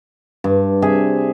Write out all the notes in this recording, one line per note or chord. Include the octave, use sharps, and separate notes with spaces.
G2
C3 G#4 E5